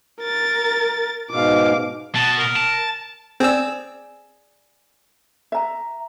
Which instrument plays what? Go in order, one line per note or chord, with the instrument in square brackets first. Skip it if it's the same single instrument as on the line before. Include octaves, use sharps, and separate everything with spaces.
[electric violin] A#4 A6
[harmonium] G#2 B2 [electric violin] F5 D6
[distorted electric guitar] B2 [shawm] A5
[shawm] A#4
[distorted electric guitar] A5
[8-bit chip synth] C4 E6 [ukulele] G#4 D5
[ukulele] E5 A#5